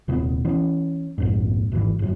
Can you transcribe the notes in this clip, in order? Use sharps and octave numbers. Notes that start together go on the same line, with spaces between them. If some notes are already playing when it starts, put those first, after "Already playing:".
D#1 C3 B3
E3 B3 C#4
A#1 F2 G#2
G#1 E2 D#3 E3
G1 F#2